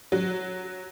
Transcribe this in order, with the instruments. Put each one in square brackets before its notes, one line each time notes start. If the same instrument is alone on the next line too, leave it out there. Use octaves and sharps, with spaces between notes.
[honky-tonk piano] F#3